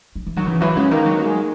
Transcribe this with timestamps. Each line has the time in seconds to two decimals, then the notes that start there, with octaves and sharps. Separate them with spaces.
0.16 F#3
0.27 E3
0.36 D#3 F#3
0.46 C#3 E3
0.61 E3 F#3
0.76 C#3 G#3
0.91 D#3 A#3
1.06 F#3
1.21 A#3
1.25 G#3